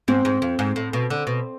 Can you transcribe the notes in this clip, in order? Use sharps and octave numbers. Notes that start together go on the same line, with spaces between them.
G#2 C4
G#2
F2
G#2
A2
B2
D3
B2